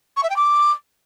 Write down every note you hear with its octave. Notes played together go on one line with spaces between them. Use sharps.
C#6
E5
G5
D6